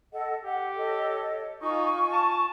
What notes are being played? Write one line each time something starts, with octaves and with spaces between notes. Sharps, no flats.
A4 D#5 F#5
G4 F#5
A4 C#5 D#5
D#4 F4 G#5 C#6
A5